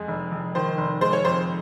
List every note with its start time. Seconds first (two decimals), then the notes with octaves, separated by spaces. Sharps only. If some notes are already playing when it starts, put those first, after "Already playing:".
Already playing: F2 G#3
0.08 F1
0.32 F1
0.55 D#3 C5
0.78 F1
1.01 G#3 C5
1.13 C#5
1.25 F2 C5